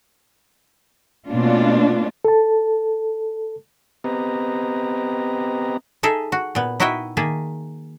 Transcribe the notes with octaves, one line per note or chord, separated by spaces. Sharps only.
B2 A3 A#3 C#4 D4 F4
A4 A5
B3 C4 G4 B4 D#5 A#5
D#4 G#4 A4 E5
F#4
A#2 B3
D#4 E4 F#4 D#5 E5 G5
D#3 A#3 G#4 E5 A5